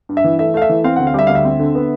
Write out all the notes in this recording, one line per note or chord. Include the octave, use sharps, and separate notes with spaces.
G2
E5
E3
A3 E5
A3 F5
E5
E3
C4 F5
D2 F#5
F5
G3 E5
D2 F5
E5
C4
D3
B3